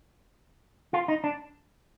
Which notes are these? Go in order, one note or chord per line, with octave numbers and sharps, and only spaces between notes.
F4
D#4
D4